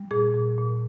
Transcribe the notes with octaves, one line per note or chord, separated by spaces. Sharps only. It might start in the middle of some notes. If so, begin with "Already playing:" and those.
Already playing: G3
A#2 G#4
A#2
A#2